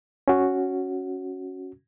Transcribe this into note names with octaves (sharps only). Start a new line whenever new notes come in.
C#4 F#4